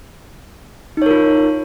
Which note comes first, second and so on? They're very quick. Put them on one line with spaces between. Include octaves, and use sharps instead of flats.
D#4 C#5 A#4 F4